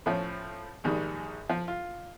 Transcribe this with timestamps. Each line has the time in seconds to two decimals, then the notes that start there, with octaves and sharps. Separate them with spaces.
0.06 A2 F3 C#4
0.84 A#1 G#2 D#3 G3
1.50 F3
1.68 F4